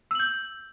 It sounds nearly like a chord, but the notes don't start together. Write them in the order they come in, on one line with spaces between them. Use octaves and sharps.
E6 F#7 G6